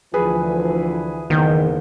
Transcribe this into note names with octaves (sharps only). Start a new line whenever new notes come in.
D2 E3 F3 G#4 B4
F#1 E2 D#3 G6